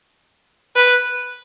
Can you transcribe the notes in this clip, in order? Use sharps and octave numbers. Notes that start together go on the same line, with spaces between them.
B4